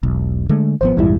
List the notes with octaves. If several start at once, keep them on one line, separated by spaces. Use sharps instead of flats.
E1 B1
D3 G#3 A3
G#1 F3 B3 C5
A#1 F2 G#2 E3 G3 E4